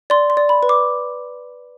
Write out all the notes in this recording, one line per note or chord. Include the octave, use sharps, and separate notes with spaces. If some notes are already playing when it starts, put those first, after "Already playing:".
D5 C6
C6
D5
B5
B4
D6